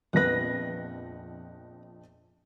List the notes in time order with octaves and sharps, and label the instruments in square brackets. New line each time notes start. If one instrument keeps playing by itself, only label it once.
[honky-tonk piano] A#1 F2 A#6 [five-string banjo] B3 B4